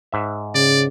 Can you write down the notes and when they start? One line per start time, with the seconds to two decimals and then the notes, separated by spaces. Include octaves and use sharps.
0.12 G#2 E5
0.55 C#3 D5